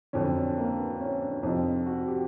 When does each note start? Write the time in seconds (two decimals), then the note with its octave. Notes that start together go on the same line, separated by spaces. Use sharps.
0.13 F2 D3 F#3 C#4
0.36 D4
0.58 A#3
0.78 B3
1.01 C#4
1.22 D4
1.43 F2 D#4
1.46 C3 F3
1.87 F#4
2.08 G4